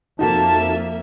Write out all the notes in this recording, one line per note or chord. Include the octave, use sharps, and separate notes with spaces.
F2 A#3 D#4 F#4 A4 E5 A5